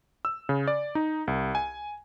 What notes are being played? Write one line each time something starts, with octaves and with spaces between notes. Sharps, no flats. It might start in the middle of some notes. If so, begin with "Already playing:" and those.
E6
C#3
D5
D#4
C2
G#5